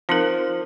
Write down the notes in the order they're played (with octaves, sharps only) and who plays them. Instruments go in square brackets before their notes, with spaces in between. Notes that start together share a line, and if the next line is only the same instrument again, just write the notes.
[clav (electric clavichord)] F3 [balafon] C4 D#4 A#4